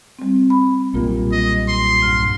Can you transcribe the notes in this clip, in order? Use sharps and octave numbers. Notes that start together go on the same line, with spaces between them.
G3 C4
B5
B1 A#2 G3 A#3 F4 A#4
D#5
C6
D2 G2 F6